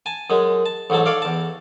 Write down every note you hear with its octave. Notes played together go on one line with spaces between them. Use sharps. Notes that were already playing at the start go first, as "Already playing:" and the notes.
G#5 A5
F#2 G#3
A5
A1 G#2 F#3 A3 A5
A4 C#5 D5 F5
E2 A5